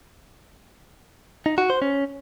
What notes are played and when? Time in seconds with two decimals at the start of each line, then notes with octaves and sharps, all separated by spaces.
1.46 D#4
1.58 F#4
1.70 C5
1.82 C#4